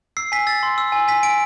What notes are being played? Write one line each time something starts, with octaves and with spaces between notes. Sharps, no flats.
E6 C7
G#5 B6
E6 A6
C6
E6
G#5
G#5 B6
G#5 D7